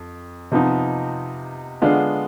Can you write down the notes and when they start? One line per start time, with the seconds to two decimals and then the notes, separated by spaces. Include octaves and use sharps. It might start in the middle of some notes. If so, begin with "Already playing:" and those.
Already playing: F2
0.52 C3 F3 B3 D#4
1.82 D3 G#3 B3 D4 F4